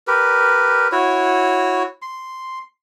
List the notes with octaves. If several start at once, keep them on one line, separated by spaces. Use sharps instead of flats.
G4 A#4 B4
E4 F#4 C#5
C6